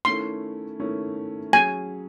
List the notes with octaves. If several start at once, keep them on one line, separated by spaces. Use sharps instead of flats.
D#3 A3 C#4 E4 C6
D#3 A3 C#4 E4
F#3 C#4 G#4 G#5